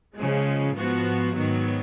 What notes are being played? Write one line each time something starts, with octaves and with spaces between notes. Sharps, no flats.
C#3 F3 G#3
G#2 F3 B3 F#4
G#2 D#3 F#3 B3